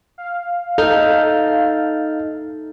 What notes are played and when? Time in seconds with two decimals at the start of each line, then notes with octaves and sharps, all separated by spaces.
0.18 F5
0.78 D#4 A4 F6 G6